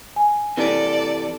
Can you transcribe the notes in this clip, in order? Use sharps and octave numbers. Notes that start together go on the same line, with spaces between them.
G#5
C3 E3 A4 D5